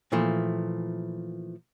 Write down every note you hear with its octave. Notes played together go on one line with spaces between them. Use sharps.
A#2 E3 F3 A3